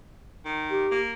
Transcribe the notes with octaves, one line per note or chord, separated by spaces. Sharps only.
D#3
G4
A#3